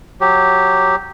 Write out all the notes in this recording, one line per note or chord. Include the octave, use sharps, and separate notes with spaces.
F#3 G4